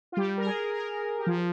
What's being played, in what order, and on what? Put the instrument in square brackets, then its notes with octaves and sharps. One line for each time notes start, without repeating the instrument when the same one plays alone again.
[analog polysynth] F4
[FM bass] G3 [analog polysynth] G4
[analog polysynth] A#4
G#4
A#4
G4
[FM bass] F3 [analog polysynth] G#4